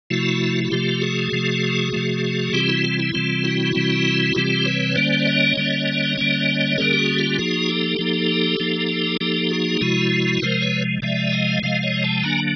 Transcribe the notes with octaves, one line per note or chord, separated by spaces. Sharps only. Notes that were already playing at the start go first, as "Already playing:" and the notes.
C3 F3 A3 E4 F#4
F#4
C3 F3 A3 F4 G4
F#4 G#4
C3 F3 A3
C3 F3 A3
C3 E3 G3 C4 F4 G4
E4 F#4
F4
E4
C3 E3 G3 C4 F4
E4 F#4
C3 E3 G3 C4
C3 E3 G3 C4 F4 G4
B4 C#5
D3 G3 A#3 C#4 C5 D5
C#5 D#5
D3 G3 A#3 C#4
D3 G3 A#3 C#4
D3 G3 A#3 C#4 G#4 A#4
G4
F#4 G#4
F4 G4
F3 A#3 D#4 F#4 G#4
G4 A4
F3 A#3 D#4
F3 A#3 D#4
F3 A#3 D#4 G4 A4
F#4 G#4
C3 F3 G#3 E4 F#4
C3 F3 G#3 A#4 C5
B4 C#5
C3 F3 G#3 D5 E5
D#5 F5
C3 F3 G#3 D#5 F5
C#5 D#5
G5 A5
D3 F#3 A#3 D4 G#5 A#5